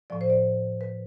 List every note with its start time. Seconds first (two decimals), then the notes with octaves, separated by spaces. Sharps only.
0.10 A2 F3 D5
0.21 C5
0.30 D5
0.81 B4